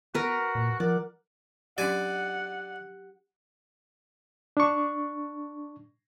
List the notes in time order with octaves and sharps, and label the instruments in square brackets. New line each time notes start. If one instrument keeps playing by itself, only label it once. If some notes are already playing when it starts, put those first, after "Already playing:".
[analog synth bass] B3 [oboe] F#4 [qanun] A#4 B4
[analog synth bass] A#2
[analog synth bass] F3 [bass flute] A#4 [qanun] D5 [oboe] F#5
[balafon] F#3 C#4 D4 [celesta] G4 [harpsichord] D5 G#5 [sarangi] F#5
[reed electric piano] D4 C#6